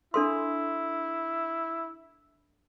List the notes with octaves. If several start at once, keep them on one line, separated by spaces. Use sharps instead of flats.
D4 E4 A4 C6